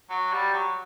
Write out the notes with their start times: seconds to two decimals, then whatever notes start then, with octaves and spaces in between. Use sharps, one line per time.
0.10 F#3
0.32 G3
0.54 F#3